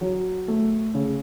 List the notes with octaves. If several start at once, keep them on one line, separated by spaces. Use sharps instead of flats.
F#3
A3
C#3